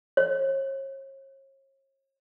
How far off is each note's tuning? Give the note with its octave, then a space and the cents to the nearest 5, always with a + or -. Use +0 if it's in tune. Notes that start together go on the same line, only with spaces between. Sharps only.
C#5 -40